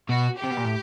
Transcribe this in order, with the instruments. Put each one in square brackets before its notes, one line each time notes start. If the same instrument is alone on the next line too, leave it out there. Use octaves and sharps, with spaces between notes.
[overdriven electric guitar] B2 [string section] F#4
[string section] G4
[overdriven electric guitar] C3
B2
A#2
A2